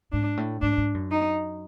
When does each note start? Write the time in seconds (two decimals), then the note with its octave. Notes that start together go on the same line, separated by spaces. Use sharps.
0.13 G#2 D4
0.37 A2
0.62 G#2 D4
0.78 G#2
0.94 F#2
1.11 D#4